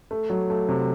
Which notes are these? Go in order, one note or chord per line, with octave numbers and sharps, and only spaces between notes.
A3
F#3
A3
C3